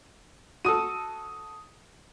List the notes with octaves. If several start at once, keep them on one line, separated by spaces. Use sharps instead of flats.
F#4 A4 D#6 D#7